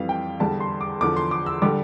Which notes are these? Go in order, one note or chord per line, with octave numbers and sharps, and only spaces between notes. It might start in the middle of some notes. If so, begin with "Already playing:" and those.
Already playing: F2 E3 G3 F5
G5
E2 D3 G3 A5
C6
D6
E2 D3 F3 D6
C6
D6
E6
D3 G3 D6